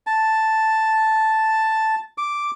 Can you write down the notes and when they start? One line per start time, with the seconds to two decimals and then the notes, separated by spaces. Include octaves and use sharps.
0.07 A5
2.18 D6